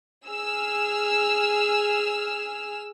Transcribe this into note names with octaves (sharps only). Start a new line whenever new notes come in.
G#4 E6 F6